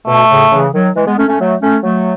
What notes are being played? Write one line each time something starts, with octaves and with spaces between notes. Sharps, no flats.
B2 A3
A2 C#3
C#3 E3
D#3 F#3
E3 G#3
G#3 B3
A3 C#4
A3 C#4
F#3 A3
A3 C#4
F#3 A3